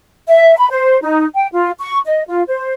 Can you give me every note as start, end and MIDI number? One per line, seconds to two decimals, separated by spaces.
0.27 0.57 76
0.57 0.67 83
0.70 0.98 72
1.02 1.25 63
1.35 1.47 79
1.52 1.71 65
1.79 1.99 85
2.06 2.22 75
2.28 2.42 65
2.48 2.74 72